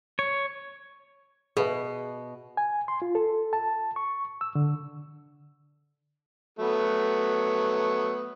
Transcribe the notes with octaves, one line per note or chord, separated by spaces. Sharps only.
C#5
B2 G#4 B4 E5
G#5
C6
F4
A4
A5
C#6
E6
D3
F#3 A3 B3